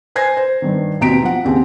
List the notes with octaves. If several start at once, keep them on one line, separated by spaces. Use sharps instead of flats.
C5 G#5 G#6 A#6 C7
C5
G2 D#3
D#2 B2 C4 A#5 B6 D7
F3 F#5
D#2 C#3 C4 G#4